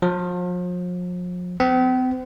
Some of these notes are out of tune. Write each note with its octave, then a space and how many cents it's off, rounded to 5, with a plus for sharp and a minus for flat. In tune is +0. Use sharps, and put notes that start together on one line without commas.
F3 +40
C4 -40